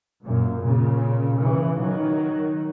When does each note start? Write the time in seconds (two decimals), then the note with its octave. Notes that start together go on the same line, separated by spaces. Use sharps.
0.25 F#2 A#2
0.63 A#2 C#3
1.40 C#3 E3
1.79 D#3 F#3